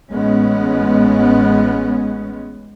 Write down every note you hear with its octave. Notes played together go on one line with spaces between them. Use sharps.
A1 G#3 B3 C#4